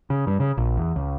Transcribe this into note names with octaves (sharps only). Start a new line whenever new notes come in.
C#3
G2
C#3
A#1
E2
C#2